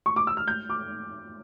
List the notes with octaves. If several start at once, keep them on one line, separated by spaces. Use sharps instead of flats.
C#6
D6
E6
F6
G6
D6